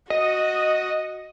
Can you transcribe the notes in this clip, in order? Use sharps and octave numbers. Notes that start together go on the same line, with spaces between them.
F#4 D#5